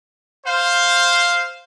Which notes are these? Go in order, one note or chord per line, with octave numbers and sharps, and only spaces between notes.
C5 F5